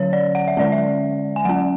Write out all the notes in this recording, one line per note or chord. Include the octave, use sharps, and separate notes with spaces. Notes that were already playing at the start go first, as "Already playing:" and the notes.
Already playing: D3 F#3 C#4 C#5
D5
F#5
E5
D3 G#3 C#4 D5
E5
G#5
F#3 C#4 F#5